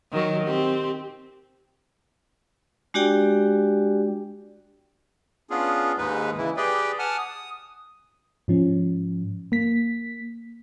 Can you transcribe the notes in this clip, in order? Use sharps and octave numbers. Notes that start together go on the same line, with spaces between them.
D#3 F#3 F#4
C4 G4
G#3 D4 F#4 G4 D5 G5
B3 C#4 D4 F4 G#4
D#2 G#2 G#3 D#4 B4
C#3 E3 E4
G4 G#4 B4 D5 G5
F#5 G#5 A5 F6
D#6
G#2 F3 C#4
A#3 B6